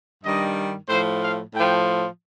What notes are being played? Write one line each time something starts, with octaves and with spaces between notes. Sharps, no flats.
G2 D#3 G3 D#5
A2 F3 C5
F5
A2 F3 G5